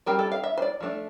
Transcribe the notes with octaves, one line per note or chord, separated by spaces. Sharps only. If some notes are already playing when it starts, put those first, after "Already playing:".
G3 C4 A#4
A4
F5
E5
C5
D5
F3 A3 D4